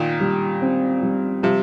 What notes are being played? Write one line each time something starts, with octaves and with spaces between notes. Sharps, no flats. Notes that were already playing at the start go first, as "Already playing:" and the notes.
Already playing: A#2 D#3 F4
G3
C4
G3
C3 F3 G3